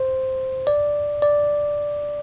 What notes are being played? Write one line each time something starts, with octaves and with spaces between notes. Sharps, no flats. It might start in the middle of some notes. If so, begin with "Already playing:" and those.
Already playing: C5
D5
D5